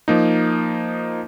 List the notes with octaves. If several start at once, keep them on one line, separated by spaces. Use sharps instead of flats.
F3 A#3 D#4